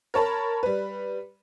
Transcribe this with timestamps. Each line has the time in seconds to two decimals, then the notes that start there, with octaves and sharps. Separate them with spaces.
0.14 A#4 C#5 A5 B5
0.63 G3 B4